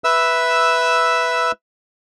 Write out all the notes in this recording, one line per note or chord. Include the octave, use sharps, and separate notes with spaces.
B4 E5 E6